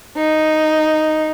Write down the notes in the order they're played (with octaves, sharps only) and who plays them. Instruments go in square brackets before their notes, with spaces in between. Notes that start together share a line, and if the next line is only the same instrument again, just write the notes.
[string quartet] D#4